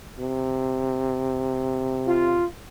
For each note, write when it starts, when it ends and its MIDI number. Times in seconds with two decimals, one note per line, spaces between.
0.19 2.42 48
2.07 2.46 65